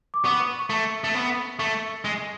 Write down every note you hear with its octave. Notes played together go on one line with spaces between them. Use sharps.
D6
B3 C#6
C#6
C#6
A3
A3
B3
A3 C#6
G#3